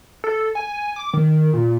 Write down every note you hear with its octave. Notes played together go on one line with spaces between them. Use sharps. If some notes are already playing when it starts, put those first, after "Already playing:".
A4
G#5
D6
D#3
A#2